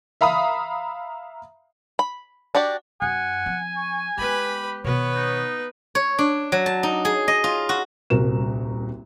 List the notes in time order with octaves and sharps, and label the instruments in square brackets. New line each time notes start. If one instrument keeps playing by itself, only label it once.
[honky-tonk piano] E5 F5 A#5 B5 D#6
[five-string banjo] B5
D4 F#4 G4 D5
[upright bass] F#2 [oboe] F#5 [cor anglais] G#5
[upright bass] F3 C4
[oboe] C#6
[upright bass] G#3 B3 [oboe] G4 [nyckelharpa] B4 B5
[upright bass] B2 D#3 [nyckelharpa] B3 B4 [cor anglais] C#5
[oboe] D#4
[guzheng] C#5
D4
F#3
A5
D#4
G#4
D#5
F4
F#4
[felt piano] D#1 C2 F#4 A#4 E7